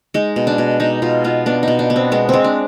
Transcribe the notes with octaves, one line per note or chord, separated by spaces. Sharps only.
G#3 D#4
B2
D4
B2
B2 D#4
B2 F4
B3 F4
B3 D4
B2 D#4
D4
B3
C4
G#3 B3
G#3 C4
D4